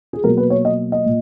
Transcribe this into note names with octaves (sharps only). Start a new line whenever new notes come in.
G#4
B2 F#3 A#3 A#4
B4
C#5
D#5
D#5
A#2